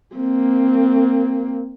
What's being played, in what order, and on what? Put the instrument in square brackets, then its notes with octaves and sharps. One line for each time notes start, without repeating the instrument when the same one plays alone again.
[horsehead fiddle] A#3 C4